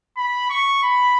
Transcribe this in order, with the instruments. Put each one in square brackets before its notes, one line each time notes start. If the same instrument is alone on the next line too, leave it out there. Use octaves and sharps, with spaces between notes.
[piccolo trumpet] B5
C#6
B5